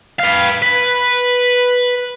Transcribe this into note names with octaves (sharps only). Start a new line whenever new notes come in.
B4 F5
B4